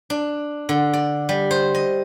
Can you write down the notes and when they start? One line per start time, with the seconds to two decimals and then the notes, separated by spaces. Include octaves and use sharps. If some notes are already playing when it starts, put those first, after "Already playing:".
0.10 D4
0.69 D3
0.93 D5
1.29 G3
1.51 C5
1.75 D#5